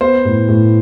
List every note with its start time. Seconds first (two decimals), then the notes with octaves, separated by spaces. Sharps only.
0.01 B3 C5
0.25 A2
0.48 A2